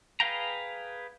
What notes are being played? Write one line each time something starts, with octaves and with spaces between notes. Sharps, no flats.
G#4 B4 F5 G5 A#5